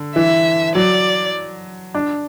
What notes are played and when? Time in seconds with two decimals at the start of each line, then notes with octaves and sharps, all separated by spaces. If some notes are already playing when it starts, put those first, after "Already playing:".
Already playing: D3
0.16 E3 E5
0.75 F#3 D5
1.95 D4